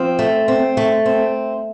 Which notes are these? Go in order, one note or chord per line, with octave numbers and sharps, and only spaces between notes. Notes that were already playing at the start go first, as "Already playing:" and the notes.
Already playing: F3 C4
A3
C4
A3
C4